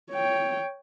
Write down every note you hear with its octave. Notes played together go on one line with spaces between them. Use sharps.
C#5 G5